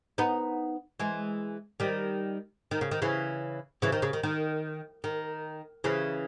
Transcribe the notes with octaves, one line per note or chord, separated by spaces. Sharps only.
B3 D#4
E3 G#3
D#3 G3
D#3
C#3
D#3
C#3 E3
C#3 E3
D#3
C#3
D#3
D#3
D#3
C#3 E3